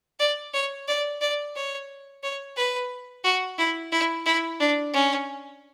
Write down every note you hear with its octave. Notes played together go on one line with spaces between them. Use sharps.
D5
C#5
D5
D5
C#5
C#5
B4
F#4
E4
E4
E4
D4
C#4